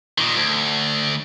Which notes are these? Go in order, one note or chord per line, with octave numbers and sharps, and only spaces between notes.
A#2 D#3
D2